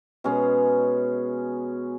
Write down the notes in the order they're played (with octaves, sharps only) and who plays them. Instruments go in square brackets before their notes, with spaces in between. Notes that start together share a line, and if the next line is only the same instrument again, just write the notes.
[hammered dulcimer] B2 G#3 C#4